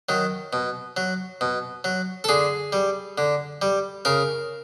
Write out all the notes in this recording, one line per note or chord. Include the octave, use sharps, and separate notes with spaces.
D#3 F#3
B2
F#3
B2
F#3
A4
D3 G#4
G3
D3
G3
C#3 A#4